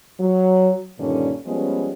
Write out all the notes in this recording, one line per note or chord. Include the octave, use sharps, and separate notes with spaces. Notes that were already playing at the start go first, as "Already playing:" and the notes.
F#3
G2 A#2 D3 D#3 C#4
F3 G3 G#3 B3 C#4